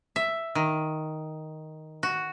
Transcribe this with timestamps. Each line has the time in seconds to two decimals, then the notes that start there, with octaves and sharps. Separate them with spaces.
0.16 E5
0.55 D#3
2.03 F#4